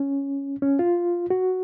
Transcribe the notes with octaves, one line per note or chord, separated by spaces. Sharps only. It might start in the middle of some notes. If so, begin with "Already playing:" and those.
Already playing: C#4
C#4
F4
F#4